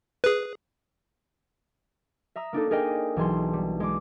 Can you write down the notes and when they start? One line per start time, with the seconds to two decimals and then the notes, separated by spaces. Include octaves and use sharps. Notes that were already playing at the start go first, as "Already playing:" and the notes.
0.24 G#4 B4
2.36 E5 A#5 D#6 E6
2.53 A#3 D4 D#4 A4
2.70 D4 G#4 A#4 D#5 G5 G#5
3.16 B1 E3 G#4 A5 C6
3.53 G3
3.80 G#3 D6